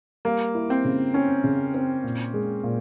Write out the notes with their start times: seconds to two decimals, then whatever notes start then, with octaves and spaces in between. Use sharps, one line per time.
0.25 G3 A#3
0.55 E4
0.70 C4
0.85 C#3
1.14 C4 C#4
1.44 C#3
1.74 C4
2.03 A#2
2.34 G#3
2.63 A#2